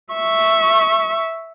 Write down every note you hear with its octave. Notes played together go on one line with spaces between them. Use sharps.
E5 C#6